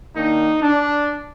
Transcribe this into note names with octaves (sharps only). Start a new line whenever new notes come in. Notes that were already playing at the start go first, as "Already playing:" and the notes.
D#3 A#3 D4 D#4
D4